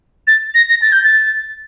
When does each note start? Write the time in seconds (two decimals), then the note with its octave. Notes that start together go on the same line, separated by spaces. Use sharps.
0.27 A6
0.54 A#6
0.70 A#6
0.82 A6
0.92 G6
1.04 A6